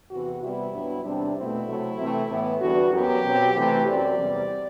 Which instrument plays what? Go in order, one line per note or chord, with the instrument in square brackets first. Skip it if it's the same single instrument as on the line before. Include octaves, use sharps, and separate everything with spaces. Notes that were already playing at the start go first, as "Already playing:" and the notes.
[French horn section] E2 C3 E3 F#4
C3 G3 B3 E4
G2 F#3 B3
E2 C3 G3 C4 D4
B2 A3 C4 E4
C3 F#3 A3
C3 E3 A3 C4
A2 E3 B3
E2 D3 G3 B3 F#4
F#2 F#3 B3 G4
B2 F#3 C4
C3 E3 A3 C4
F#2 F#3 C4 D5
E2 C3 G3